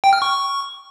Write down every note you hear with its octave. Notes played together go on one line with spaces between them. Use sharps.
G5
F6
C#6